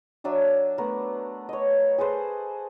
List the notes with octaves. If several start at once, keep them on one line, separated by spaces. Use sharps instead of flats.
F#3 D4 E5 D#6
A3 B3 A#4
C#5 D#5
G#4 A4 B4 C5